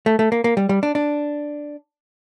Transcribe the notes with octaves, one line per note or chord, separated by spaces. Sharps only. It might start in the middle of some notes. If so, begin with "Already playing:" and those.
A3
A3
A#3
A#3
G3
G3
D4
D4